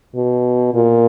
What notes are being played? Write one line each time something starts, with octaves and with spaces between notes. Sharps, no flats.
B2
A#2